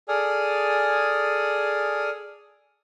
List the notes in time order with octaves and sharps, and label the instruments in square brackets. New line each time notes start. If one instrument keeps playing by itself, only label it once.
[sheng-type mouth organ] G#4 A4 D5 G#5 D#6 F6